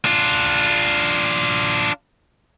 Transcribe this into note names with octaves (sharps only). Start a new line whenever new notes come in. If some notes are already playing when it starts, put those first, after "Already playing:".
D4 F4